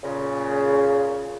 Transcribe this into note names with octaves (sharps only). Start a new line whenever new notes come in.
A#2 C#3